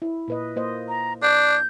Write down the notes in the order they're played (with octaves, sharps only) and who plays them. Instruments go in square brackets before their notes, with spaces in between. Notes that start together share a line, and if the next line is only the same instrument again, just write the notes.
[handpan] E4
A#2 B4 D#5
A#3 C5 D#5
[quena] A#5
[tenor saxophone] D4 [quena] G6